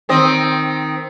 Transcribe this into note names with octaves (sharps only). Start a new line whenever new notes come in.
D#3 C4 D#5